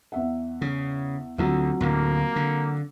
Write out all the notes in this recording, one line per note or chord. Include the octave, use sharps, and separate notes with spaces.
E2 E5 F#5
C#3
D2 D3 F#3 C4 F4
D2 A2 D3 A#3
D3